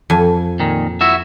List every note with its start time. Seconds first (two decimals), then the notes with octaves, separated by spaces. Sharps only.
0.10 F2 G#5
0.60 A#2 D#3
1.01 E4 F#4 E5